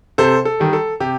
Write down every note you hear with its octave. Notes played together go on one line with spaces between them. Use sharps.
C3 A4 C5
A4
D#3 G3
A4
C3 G4